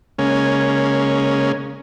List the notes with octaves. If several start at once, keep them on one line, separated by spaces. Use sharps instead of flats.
C#3 G#3 A#3 C#4